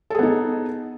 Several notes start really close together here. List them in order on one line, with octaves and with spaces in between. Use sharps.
A4 G#4 B3 D#4